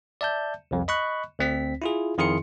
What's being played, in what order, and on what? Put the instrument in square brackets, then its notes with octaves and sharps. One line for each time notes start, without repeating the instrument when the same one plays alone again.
[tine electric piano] D5 E5 A5 G6
C2 F2
D#5 B5 C#6 F#6
D2 C4 B6
E4 F4 G#4
F2 D#3 E4 G#4 C6 C#7